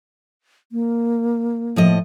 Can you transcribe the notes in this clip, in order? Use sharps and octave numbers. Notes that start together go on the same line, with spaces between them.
A#3
A2 F3 D#5